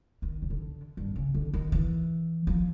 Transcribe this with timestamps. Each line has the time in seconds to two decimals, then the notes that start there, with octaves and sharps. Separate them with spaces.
0.22 D#3
0.42 C#3
0.50 D3
0.97 G2
1.16 C#3
1.34 D3
1.53 D#3
1.72 E3
2.47 F3